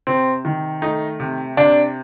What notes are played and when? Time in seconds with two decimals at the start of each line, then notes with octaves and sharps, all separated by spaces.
0.07 C3 C4
0.45 D#3
0.82 A3 D#4
1.20 C3
1.57 C3 D4